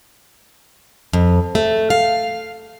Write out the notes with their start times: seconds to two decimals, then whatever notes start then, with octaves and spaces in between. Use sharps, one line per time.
1.13 F2
1.55 A3
1.90 F5